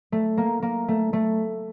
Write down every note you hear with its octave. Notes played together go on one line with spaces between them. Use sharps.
A3
A#3
A#3
A3
A3